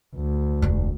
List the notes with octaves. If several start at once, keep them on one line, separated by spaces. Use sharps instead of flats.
D2
E1 D4